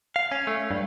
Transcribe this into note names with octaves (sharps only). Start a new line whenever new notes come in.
F5
C#4
A3
G2